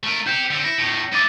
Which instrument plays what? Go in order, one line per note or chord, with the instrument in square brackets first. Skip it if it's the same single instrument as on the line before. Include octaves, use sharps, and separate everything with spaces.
[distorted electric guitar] A3 A#4
[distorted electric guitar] G4 C5 [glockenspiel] G6 C#7
[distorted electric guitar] D3 C4
[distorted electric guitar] E4 [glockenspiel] A#6
[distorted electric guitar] E2 A2
[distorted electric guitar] E4 D#5 [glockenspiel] D6 A6 D#7